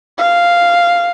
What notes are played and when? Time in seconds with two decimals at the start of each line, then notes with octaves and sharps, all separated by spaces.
0.18 F5